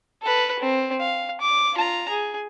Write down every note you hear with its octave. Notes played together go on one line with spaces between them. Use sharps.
A4 B4
C4
F5
D6
F4 A#5
G#4